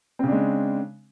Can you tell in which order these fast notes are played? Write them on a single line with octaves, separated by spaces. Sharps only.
C4 C#3 D4 G#3